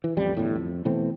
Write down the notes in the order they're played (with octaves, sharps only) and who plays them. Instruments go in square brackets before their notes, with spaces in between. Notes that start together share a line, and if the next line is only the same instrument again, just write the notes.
[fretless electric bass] E3
A1 F2 G3
G1 E2 A2
F2
B2 E3 A3 C4